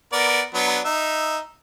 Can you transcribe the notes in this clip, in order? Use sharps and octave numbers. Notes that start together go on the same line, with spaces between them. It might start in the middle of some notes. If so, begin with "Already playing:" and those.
B3 A#4 D5
F#3 B3 D4
D#4 E5